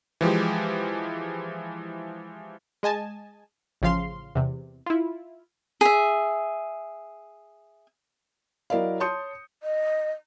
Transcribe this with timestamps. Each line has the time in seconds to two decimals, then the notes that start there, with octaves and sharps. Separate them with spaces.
0.21 E3 F3 G#3 G4
2.83 G#3 D#5 G#5 A5
3.82 A1 C#3 F3 F5 C6
4.35 E2 C3
4.86 E4 F4
5.81 G#4 E5
8.70 F#3 E4 A#4 D5 D#5 F5
9.00 C#5 A5 C6 D#6 G6 C#7
9.63 D#5